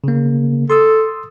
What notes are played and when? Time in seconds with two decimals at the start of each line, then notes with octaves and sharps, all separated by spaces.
0.04 C#3 A#3
0.70 A4 C6 D#6 E6